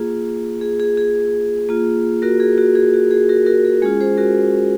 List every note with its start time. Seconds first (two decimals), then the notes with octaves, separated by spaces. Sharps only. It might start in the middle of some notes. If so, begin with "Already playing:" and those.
Already playing: A#3 F4 G#4
0.61 G#4
0.80 G#4
0.97 G#4
1.69 A#3 F4
2.22 F#4 A#4
2.40 G#4
2.58 F#4
2.75 G#4
2.94 F#4
3.11 G#4
3.29 F#4 A#4
3.46 F#4 A#4
3.65 G#4
3.82 G#3 C#4 F4 G#4
4.00 G#4 C5
4.17 F#4 A#4